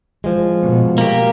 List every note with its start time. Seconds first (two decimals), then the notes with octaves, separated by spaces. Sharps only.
0.24 F3 G#3
0.62 B2
0.98 A#3 G4